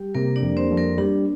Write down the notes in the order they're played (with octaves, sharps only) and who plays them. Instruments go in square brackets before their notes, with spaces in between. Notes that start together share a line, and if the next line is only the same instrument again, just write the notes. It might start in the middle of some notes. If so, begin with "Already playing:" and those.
Already playing: [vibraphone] G3 G4
[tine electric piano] C3 [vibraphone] A#3 A#4
[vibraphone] D4 D5
[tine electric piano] F2
[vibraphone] C4 C5
[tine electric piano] F2
[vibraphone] A#3 A#4
[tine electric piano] G3 [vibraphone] D4